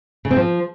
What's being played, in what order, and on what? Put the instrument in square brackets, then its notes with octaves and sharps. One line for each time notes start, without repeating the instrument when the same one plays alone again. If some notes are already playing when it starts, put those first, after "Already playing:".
[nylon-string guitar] C#3
C4
F3